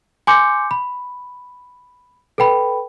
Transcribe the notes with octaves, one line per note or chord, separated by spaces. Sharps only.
G#5 C6 D6 G6 C#7
B5
A4 B4 G5 B5